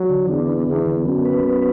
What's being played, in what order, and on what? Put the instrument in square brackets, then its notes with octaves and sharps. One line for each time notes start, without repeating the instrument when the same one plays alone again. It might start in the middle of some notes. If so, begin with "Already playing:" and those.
Already playing: [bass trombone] F#3
[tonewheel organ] D3
[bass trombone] E2 [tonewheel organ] D4
[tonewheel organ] B3
[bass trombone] E2 [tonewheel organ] D3
[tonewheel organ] D3
[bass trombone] F#2 [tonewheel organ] B3
[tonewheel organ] B4
B3